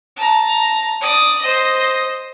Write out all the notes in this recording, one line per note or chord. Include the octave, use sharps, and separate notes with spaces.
A5 A#5
D5 D#6
C5 D#5